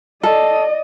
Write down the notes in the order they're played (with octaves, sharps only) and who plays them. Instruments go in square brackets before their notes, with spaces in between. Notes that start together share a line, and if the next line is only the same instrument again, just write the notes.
[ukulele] A4 [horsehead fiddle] D5 D#5